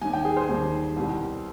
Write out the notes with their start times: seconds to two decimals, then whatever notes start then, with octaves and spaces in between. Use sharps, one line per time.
0.01 D#2 D#3 G3 G#5
0.13 G5
0.25 G#4
0.37 C5
0.49 D#2 D#3 G3
0.96 C2 B2 G3